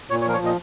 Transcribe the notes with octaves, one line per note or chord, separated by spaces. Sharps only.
A#2 C#5
C#5
F3 A#4
C#5
A#2 D#5